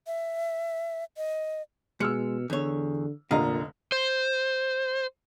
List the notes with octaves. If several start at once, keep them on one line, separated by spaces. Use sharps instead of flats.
E5
D#5
B2 G#3 E6 F6 C#7
E2 D3 C#5
F1 A#2 D3 D#5 F5 A#5
C5